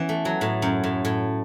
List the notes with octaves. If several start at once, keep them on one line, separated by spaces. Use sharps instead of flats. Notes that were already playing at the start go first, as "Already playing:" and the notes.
Already playing: E3 B3 C#4
A3
F#3
A2
F#2
A2
A2